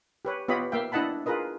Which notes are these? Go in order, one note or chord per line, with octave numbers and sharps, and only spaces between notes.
G4 B4 C#5
B3 F4 G4 C#5 D#5 B5
A#3 E5 F5 G5
D4 E4 D#5 F#5 A5 B5
F4 G#4 A#4 B4 D#5